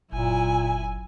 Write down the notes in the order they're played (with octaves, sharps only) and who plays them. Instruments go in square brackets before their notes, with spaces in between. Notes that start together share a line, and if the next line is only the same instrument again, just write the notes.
[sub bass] F#1 [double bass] F#2 [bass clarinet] A#2 [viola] E4 G#5